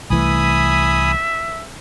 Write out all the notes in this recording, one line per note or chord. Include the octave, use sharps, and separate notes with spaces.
C2 E3 A3 E5 G#5 B5 D#6